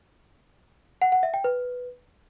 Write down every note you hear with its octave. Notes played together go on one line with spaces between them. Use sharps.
F#5
F#5
E5
G5
B4